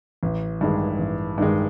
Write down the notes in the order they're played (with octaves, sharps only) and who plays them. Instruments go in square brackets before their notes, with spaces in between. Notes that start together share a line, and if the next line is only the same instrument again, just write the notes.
[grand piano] A1
G2 D#3 G#3
A1
G2 D#3 G#3